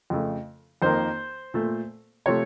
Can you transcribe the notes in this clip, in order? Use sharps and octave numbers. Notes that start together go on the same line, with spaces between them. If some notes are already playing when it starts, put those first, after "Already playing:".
F2 C#3 A3
F2 D#3 A#3 C5
A#2 A3
C3 F3 A3 C#5